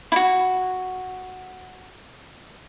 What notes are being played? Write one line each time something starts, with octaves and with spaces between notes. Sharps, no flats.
E4 F#4